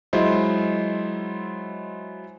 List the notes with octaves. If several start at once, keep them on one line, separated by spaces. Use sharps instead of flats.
F#3 G#3 E4 F4 C5 D#5